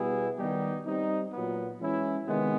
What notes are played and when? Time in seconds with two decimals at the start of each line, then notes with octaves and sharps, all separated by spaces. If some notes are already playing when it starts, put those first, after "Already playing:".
Already playing: B2 G3 B3 E4 G#4
0.38 D#3 G3 B3 D#4 G4
0.86 G3 C4 D#4
1.33 A#2 F#3 B3
1.80 E3 G#3 C#4 E4
2.27 C3 D#3 G#3 B3